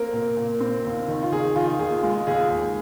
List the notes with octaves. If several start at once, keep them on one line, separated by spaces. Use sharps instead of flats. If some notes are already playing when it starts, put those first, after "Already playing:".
Already playing: A#3 C4 A#4
A#2
A#2
C4
D#2
D#3
F4
D#3 G#4
D#3 F4
D#2 G#4
G#3 F4
D#2 G#4
D#2